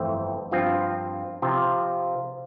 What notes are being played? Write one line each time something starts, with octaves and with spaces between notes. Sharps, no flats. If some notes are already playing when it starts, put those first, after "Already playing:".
Already playing: G1 F2 E3 A3 C4
G2 F3 C4 F4
C3 F3 C4 F4